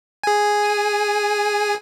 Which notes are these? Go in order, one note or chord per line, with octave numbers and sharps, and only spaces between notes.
G#4 G#5